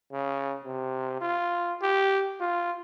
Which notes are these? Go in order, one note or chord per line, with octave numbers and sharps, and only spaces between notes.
C#3
C3
F4
G4
F4